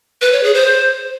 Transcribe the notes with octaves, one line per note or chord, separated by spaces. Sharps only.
B4
C#5
G#4
C5